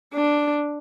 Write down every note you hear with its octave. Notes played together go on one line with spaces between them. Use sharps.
D4